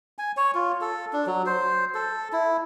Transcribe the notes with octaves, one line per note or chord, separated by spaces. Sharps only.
G#5
C#5
F4
A4
D4
F#3
C5
A4
E4